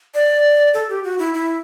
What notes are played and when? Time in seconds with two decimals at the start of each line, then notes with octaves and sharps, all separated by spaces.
0.14 D5
0.74 A4
0.89 G4
1.04 F#4
1.19 E4
1.34 E4